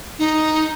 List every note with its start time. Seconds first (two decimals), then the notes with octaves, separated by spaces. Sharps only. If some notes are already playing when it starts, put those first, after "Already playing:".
0.18 D#4